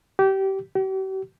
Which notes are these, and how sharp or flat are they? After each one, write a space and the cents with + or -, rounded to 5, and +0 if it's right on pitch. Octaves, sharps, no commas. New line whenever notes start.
G4 -25
G4 -45